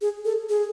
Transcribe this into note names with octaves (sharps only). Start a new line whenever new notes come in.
G#4
A4
G#4